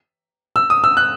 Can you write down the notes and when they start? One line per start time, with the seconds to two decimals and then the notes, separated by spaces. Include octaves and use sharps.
0.56 E6
0.70 D#6
0.84 E6
0.97 F#6